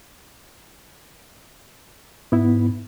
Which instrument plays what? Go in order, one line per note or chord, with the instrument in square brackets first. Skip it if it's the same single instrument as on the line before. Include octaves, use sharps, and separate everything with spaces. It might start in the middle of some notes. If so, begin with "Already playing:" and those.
[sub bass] G#2 [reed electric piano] B3 E4